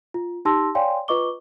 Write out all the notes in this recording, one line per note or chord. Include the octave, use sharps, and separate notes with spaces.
F4
D#4 G4 A5 C6 E6 A#6
C#5 D5 F5 G5 G#5 C6
F4 B4 D#5 C#6 D6 G7